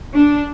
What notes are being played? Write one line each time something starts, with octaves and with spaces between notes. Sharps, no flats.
D4